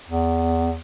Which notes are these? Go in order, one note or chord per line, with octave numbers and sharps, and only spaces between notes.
E2